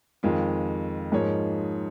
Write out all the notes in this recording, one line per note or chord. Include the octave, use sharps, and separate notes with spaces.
F2 D#3 G#3 F4
G#2 F3 A#3 D#4 C#5